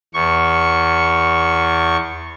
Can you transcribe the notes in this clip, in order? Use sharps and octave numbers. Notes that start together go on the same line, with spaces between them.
E2 C#6